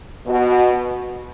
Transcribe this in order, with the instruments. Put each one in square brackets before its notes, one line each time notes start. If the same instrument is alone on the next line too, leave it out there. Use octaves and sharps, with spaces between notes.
[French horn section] B2